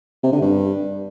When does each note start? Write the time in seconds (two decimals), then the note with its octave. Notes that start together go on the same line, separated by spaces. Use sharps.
0.23 C3
0.32 D3
0.42 G2